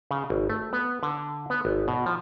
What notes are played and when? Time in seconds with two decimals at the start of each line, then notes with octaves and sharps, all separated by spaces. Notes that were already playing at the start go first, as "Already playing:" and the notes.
0.11 C#3
0.30 G#1
0.50 A3
0.73 B3
1.03 D3
1.50 B3
1.65 G#1
1.88 B2
2.06 F3